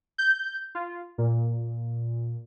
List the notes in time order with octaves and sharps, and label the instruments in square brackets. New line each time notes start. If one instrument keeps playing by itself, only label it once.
[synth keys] G6
F4
A#2